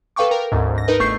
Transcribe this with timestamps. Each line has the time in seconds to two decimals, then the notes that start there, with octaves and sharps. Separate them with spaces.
0.16 A4 B4 F5 G5 C#6 D6
0.31 A#4 G5
0.52 G#1 D2 G#2
0.75 G#2 A#6
0.88 D#4 A#4 B4 D#5
0.99 G1 A3 C#6 G6 C7